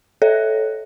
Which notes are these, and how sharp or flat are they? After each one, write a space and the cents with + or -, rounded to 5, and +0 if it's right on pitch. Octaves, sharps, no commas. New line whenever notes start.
A4 -10 C#5 -10 E5 -5